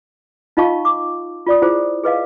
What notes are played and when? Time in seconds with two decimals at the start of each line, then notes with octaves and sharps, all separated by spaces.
0.57 D#4 F4 D#5 F5 A5 C#6
0.85 D6
1.47 F4 D5 D#6
1.62 E4 F4 G#4 C5
2.04 G#4 B4 D#5 F5